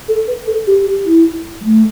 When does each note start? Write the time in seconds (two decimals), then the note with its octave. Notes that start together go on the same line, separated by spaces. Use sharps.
0.08 A4
0.28 B4
0.47 A4
0.67 G4
0.87 G4
1.06 E4
1.61 G3
1.65 A3